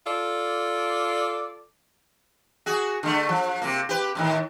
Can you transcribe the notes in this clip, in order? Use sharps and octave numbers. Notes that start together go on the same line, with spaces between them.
F4 A4 D5
F#4 G#4
D3 A3
F3
C3 A#3
G4 B4
F2 A2 D#3